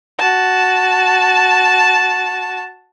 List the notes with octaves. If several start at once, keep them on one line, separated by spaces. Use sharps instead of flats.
F#4 A5